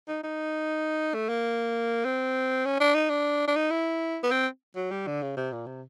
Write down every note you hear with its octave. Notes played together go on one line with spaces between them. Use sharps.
D#4
D#4
A3
A#3
C4
C#4
D4
D#4
D4
D4
D#4
E4
B3
C4
F#3
G3
D3
C#3
C3
A#2
C3